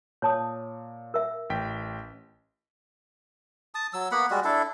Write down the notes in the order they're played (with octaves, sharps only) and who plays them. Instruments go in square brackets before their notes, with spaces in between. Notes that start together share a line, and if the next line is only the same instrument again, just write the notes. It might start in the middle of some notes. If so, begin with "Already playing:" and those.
[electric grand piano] A#2 [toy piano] C#5 A5 D#6
[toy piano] A#4 E5
[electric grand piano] A1 G5 B6
[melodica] A5 D#6
F#3 E6
A#3 B3 F#5 B5
G3 G#3 F#4
D4 E4 A4